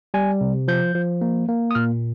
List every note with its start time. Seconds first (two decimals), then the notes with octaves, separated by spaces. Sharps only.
0.14 G3 G#5
0.41 C3
0.68 F3 G6
0.95 F3
1.21 A#3
1.49 A#3
1.71 D#6
1.75 A#2 F6